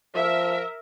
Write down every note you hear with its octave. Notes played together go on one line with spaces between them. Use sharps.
F3 A#4 E5